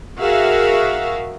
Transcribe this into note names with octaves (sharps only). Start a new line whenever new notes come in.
F#4 G#4 A#4 E5 F5